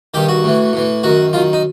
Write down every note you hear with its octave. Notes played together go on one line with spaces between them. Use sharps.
G2 D#3 G4
F#4
A2 E3
A2 E3
F#2 D#3 F#4
F#2 D#3 F4
D#4